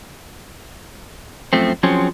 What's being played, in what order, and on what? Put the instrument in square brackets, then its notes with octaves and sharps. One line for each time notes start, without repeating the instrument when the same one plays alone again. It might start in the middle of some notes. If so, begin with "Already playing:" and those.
[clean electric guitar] F#2 F3 A3 C4
F3 F#3 C4 C#4 G#4